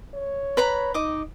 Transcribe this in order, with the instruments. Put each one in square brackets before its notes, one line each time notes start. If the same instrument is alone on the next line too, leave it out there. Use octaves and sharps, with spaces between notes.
[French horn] C#5
[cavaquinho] B4 A#5 B5
[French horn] D#4 [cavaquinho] D#5 D6